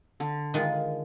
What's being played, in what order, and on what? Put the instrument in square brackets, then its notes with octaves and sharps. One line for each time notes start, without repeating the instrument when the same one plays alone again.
[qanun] D3
[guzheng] D#3 G#3 F4